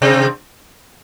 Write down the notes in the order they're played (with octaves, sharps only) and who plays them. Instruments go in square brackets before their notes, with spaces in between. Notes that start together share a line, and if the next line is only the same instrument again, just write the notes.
[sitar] C3 C4